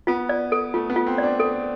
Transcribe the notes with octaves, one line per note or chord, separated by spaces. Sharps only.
B3 F4
D5
A4
A3 F4
B3
F4
C4
D4 D5
A4